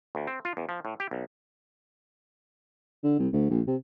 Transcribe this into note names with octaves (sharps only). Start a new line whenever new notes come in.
D2
C4
F4
E2
F3
A2
G4
B1
D3
C2
D2
A#1
C3